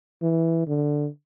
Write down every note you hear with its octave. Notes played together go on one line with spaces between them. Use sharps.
E3
D3